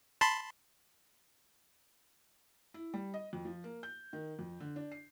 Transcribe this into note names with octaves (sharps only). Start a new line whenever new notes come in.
A5 B5 C6
E4
G3
D#5
F2
F3
A#3
G6
D#3
F2
D3
D4
C7